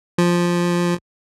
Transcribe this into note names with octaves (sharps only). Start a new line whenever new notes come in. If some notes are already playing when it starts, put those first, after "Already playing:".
F3